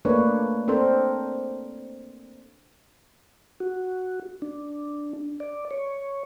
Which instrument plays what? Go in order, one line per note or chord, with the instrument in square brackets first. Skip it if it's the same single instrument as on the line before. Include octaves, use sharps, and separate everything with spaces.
[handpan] A3 A#3 D4 B4 C#5
C4 D4 A4 A#4 C5
[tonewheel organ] F#4
D4
D5
C#5